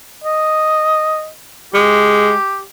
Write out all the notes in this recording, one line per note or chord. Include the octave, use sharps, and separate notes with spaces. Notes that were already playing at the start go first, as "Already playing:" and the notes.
D#5
G#3 G4